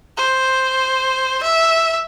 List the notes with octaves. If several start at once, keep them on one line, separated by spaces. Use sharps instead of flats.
C5
E5